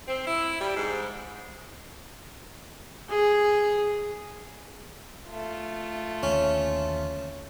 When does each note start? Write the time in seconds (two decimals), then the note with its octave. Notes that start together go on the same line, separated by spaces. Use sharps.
0.08 C4
0.27 E4
0.60 G3
0.77 G#2
3.10 G#4
5.29 A3 F4
6.23 D#2 D3 C#4